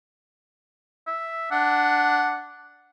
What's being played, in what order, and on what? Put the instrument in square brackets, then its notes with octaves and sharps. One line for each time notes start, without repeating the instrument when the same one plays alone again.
[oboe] E5
[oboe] D4 [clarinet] F#5